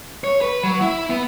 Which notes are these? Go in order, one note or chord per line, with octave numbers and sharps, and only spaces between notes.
C#5
B4
F#3
E4
B3